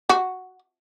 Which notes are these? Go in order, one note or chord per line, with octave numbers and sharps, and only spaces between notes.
F#4